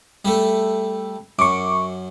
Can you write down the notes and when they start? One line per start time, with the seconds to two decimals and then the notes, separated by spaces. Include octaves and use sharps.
0.25 G3 A3
1.39 F#2 C#6 D6